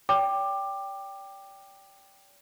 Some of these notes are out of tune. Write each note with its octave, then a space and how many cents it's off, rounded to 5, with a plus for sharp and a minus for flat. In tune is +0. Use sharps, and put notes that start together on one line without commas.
D5 -45 G5 +0 D6 +15